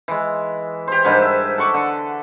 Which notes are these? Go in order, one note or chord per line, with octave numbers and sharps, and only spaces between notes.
E3 G#3
G4 C5
G#2 G3 D4 A#4
E5
A4 F#5 C#6 D6
D3